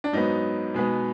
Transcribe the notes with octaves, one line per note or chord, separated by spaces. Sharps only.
D4
G#2 F#3 B3 D#4
B2 G#3 B3